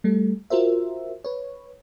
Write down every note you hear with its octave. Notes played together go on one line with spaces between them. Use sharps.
G3 A3 A4
F4 F#4 A#4 C5 E5
B4 C#5